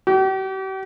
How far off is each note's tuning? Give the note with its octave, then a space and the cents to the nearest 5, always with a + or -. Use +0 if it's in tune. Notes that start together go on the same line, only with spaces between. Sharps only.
G4 -40